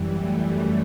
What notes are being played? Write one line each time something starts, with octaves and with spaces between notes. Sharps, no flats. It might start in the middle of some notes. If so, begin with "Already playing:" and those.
Already playing: F#2 E3 G3
A3